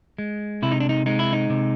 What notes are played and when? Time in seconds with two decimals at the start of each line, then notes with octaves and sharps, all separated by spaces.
0.18 G#3
0.62 C3 E4
0.72 D#4
0.80 D4
0.89 D#4
1.06 G#3 D#4
1.19 E4
1.33 D#4
1.50 C3